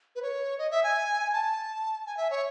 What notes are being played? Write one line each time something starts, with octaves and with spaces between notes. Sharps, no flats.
B4
C#5
D#5
E5
G#5
A5
G#5
E5
C#5